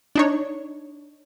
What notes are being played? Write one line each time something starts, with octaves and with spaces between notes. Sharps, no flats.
D4 D#4 C#5